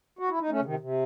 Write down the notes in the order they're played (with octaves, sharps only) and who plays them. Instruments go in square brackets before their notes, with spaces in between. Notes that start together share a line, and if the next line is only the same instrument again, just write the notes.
[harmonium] F#4
E4
D#4
A3 C#4
C#3
C3 D#3
C3